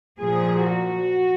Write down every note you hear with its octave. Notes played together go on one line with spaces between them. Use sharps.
A#2 F3 G#4
F#4